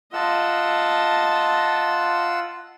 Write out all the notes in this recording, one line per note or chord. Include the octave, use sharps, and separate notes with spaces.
F4 D#5 F#5 A5 E6